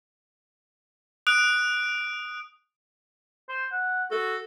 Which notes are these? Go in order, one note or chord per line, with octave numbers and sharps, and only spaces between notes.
D#6 F#6 D7
C5
F#5
F#4 A4